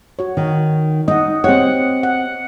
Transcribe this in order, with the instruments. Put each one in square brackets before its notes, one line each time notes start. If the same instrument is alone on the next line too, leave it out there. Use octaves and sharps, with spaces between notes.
[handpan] F#4 C#5
[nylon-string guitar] D#3
[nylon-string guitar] D#4 [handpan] D#5 F#5
[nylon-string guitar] C4 G4 C#5 [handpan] F#5
[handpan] F#5